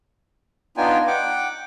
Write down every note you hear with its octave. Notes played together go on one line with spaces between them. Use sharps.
B3 D4 D#4 F4 G5 G#5
F#5 G5 D6